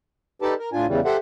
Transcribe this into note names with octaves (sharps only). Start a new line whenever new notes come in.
D#4 G4 A4 B4 D5 A5
A#4
A2 D4 F4 G#5
E2 C#3 E3 G3
G4 A4 C5 E5 F#5